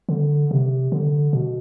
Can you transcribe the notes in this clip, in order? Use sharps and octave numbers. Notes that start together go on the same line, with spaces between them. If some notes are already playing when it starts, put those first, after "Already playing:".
D3
C3
D3
B2